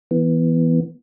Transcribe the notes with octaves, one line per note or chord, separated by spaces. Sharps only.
E3 B3